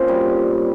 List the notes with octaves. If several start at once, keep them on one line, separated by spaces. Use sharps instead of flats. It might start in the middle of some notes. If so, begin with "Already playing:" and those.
Already playing: A#2 C4 C#4
G3